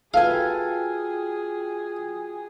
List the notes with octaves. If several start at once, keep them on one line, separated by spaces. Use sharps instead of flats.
F4 F#4 G#4 A4 B4 F5 G5 G#5